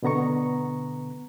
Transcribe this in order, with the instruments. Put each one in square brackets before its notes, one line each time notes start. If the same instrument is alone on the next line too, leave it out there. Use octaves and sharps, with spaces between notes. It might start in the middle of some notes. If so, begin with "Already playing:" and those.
[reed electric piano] B2 D3 B3 A#5 C#6